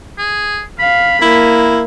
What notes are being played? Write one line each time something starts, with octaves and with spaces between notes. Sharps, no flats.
G#4
F5 B5
A#3 E4